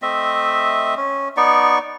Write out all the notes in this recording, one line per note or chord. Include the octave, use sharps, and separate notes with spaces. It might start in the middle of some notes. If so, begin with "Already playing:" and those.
A3 C4 D#5 E5
C#4
B3 D#4 D5 C#6